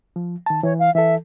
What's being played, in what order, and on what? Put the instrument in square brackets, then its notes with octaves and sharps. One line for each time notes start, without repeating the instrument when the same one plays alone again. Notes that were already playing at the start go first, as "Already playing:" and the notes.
[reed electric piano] F3
D#3 A5
[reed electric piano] E3 [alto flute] C#5
[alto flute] F5
[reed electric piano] E3 A4 [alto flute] E5